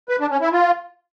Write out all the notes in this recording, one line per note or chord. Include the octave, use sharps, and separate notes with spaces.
B4
D4
C#4
E4
F4